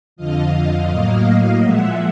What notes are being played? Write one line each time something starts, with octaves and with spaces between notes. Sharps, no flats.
F2 D3 F3 D#5 F5
D#5 F5
A2 F#3 A#3 D#5 F5
A#2 F3 G#3 E5 F#5